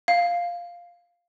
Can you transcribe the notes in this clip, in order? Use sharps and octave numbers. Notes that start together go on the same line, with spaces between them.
F5